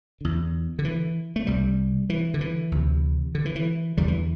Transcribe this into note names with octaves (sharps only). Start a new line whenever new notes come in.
E2 D3
D3
E3
A3
C2 C3 G3
E3
D3
E3
D2 C3
D3
E3
E3
E2 D3 G3
E3